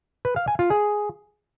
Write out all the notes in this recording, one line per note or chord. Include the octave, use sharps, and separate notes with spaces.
B4
F5
G#5
F4
G#4